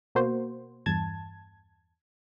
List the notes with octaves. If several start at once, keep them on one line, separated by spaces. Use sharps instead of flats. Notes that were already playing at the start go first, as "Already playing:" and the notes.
B2 A#3 F#4 C5
E2 G2 A5 G#6